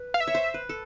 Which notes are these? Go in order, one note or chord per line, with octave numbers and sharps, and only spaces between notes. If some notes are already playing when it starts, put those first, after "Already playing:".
Already playing: B4
F5
E5
C#5
C5
B4
A4